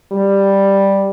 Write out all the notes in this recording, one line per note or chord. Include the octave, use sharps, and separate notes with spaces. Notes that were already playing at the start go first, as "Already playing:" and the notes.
G3